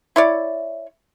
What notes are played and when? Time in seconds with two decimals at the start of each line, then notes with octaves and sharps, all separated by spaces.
0.16 E4 C#5 D5